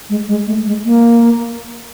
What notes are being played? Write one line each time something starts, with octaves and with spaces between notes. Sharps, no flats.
G#3
G#3
A3
G#3
A#3